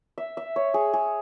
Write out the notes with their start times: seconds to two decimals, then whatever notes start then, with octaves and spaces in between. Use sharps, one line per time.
0.18 E5
0.37 E5
0.56 C#5
0.74 G#4
0.93 G#4